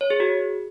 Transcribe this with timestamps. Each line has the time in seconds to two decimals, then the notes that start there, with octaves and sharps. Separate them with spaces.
0.01 C#5
0.10 G#4
0.20 F#4